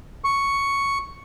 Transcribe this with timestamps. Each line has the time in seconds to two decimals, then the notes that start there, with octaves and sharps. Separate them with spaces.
0.24 C#6